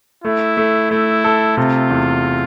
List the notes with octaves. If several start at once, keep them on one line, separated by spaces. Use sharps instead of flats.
A3 E4
A3
A3 E4
A4
C3 F4
E2